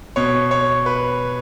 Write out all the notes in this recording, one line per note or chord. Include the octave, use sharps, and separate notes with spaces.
B2 C#5
C#5
B4